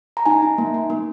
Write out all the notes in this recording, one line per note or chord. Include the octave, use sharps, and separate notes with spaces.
A#5
D#4 G#5
D#4
A#3
A#3
A#3